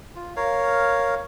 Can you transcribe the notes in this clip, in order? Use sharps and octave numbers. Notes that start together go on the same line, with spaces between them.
F4
A#4 C#5 F5